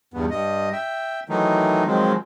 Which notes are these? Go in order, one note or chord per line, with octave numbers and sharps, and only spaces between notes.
E2 G2 B3
G2 D#5
E5 G5
D#3 E3 F#3 A3 D#4
D#3 F3 F#3 G#3 C4